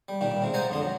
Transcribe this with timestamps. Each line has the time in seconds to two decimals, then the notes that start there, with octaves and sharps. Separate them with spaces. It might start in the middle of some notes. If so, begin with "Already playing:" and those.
0.09 G3
0.21 A#2 D#3 G3
0.42 C3 G#3
0.54 C5 D5 D#5 F#5 G#5 A#5
0.70 F2 D3 C6
0.81 F#3